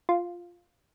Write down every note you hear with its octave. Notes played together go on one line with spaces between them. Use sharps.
F4